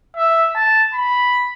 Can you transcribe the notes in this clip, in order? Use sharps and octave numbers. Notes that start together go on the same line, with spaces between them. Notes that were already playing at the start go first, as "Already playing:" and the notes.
E5
A5
B5